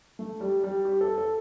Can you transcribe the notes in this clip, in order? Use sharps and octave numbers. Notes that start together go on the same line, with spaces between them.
A3
G3
G3
G4
A4
A4